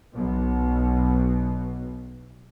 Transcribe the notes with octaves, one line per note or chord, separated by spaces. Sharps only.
B1 B2